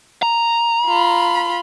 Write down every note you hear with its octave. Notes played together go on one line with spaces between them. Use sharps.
A#5
F4 B5